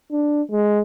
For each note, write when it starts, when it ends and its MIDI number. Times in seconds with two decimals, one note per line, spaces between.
0.12 0.42 62
0.51 0.80 56